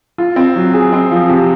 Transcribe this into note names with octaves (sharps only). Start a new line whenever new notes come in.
F4
C4
F#3
G#4
C4
F3
C3